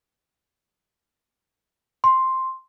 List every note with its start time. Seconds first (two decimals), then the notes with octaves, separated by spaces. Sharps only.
2.04 C6